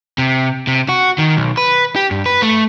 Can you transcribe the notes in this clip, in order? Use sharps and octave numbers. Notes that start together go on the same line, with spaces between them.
C3
C3
F#4
D#3
B1
B4
G4
G2
B4
A3